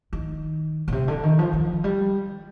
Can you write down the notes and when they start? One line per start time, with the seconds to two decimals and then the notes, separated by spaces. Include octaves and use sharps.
0.13 D#3
0.88 B2
0.92 C3
1.08 D3
1.23 D#3
1.39 F3
1.53 F3
1.84 G3